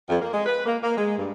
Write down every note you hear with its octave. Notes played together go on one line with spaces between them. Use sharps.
F2
A#3
G#3
B4
A#3
A#3
G#3
G2